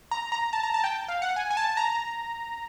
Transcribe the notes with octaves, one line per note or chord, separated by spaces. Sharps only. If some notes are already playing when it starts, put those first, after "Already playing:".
A#5
A#5
A5
A#5
A5
G5
F5
F#5
G#5
G#5
A5
A#5